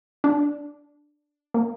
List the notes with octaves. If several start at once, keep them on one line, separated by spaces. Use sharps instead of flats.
D4
A#3